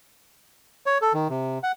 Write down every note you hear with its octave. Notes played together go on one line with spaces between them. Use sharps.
C#5
A4
D#3
C3
F#5